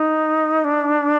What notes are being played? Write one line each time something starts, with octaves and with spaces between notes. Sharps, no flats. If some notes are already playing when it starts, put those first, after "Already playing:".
Already playing: D#4
D4